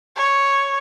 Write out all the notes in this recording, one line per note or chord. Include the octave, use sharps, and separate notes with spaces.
C#5